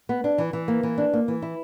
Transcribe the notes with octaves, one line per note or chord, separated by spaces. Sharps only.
B3
D4
E3
E3
A#3
E3
D4
A#3
E3
E4